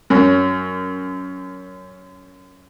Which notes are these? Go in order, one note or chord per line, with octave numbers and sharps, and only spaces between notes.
F#2 F#3